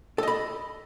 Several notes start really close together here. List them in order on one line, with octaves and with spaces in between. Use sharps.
A4 D#5 B5